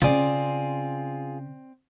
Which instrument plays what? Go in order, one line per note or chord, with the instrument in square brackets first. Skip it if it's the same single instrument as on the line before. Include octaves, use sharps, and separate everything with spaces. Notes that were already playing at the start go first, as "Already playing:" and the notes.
[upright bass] C#3 C#4 [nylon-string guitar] C4 D5 [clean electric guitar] F4 G#4